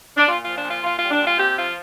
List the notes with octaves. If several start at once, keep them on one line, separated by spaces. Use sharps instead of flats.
D4
A#2 F4
F3 F4
D4
A#2 F4
A#2 F4
G3 F4
D4
A#2 F4
C3 G4
F3 F4